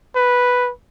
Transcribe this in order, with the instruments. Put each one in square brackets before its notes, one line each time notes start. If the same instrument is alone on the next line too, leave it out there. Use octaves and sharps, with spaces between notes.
[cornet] B4